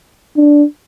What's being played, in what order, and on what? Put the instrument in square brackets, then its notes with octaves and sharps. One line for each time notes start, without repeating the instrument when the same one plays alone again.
[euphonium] D4